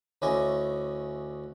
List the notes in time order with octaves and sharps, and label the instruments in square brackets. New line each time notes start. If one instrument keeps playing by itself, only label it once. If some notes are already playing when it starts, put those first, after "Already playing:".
[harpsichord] D2 C#4 E4 D5 D#5 G#5